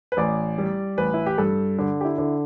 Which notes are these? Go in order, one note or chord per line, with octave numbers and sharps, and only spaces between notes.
B4
A1 D5
G3
A1 B4
E4
G4
G2 A4
D3
G4
E4
D3